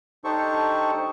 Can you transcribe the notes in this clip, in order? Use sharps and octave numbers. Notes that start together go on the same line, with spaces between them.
D4 D#4 G4 A4 C5 C#6